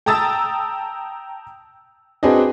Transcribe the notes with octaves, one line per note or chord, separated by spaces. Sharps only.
G5 A5 A#5 D#6 E6 A6
C4 D4 F#4 G#4 B4 D#5